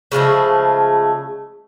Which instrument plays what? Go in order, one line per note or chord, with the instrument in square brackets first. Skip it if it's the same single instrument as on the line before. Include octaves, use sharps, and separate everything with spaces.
[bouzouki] C#3 F3 G#3 A3